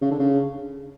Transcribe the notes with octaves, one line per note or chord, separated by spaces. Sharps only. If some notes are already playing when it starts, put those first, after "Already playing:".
C#3
D3
C#3